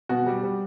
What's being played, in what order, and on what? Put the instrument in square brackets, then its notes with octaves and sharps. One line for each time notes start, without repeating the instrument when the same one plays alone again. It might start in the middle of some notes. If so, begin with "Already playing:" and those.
[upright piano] B2 F#4
G3
G3